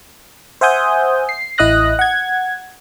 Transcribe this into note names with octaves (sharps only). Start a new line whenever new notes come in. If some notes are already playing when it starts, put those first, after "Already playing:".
C5 E5 F#5 G#5 D#6 G6
C7
A1 E4 D#5 D#6 F#6 A#6
F#5 G#6